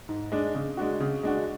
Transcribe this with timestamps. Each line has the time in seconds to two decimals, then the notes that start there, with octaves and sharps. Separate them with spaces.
0.09 G#2
0.32 G#3 D4
0.55 C#3
0.77 G#3 D4 F#4
1.00 C#3
1.23 G#3 D4 F#4